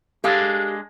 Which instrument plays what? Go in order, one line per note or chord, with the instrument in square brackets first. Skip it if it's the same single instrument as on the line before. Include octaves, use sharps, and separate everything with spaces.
[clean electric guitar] G#3 D4 [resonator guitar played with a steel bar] G4 A4 F5